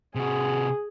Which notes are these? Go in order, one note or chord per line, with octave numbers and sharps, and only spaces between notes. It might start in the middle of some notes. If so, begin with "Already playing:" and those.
C3 F#4 G#4